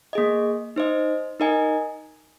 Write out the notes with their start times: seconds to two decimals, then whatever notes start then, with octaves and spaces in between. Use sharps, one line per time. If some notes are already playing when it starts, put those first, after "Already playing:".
0.13 A#3 G#4 D#5
0.76 D#4 C5 D#5
1.40 D#4 A#4 D#5 G#5